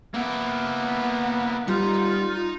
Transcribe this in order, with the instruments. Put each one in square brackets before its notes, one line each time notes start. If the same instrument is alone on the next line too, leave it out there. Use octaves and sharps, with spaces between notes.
[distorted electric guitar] A#3 E4 [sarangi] B3
[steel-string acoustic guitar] G3 [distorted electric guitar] D#4 A#5 [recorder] F4